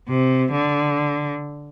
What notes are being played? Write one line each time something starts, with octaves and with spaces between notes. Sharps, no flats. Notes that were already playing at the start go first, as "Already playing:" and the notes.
C3
D3